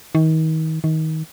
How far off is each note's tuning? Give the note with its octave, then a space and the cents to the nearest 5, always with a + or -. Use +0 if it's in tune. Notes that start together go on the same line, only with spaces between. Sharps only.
D#3 +35
D#3 +25